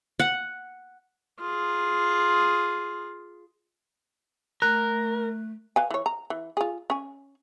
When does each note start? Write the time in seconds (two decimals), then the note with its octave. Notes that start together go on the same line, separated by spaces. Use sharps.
0.19 F#5
1.40 F4 G#4
4.62 A3 A#4 F#6
5.76 B4 F5 G#5
5.90 E3 C#5
6.06 A#5
6.30 E3
6.57 F4 G#4
6.90 C#4 G#5